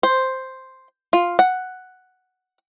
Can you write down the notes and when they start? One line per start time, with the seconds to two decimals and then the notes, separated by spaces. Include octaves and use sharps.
0.03 C5
1.13 F4
1.39 F#5